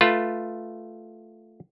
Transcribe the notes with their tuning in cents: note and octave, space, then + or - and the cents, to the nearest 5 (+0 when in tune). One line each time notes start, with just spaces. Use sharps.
A3 +0 F4 +0 B4 +0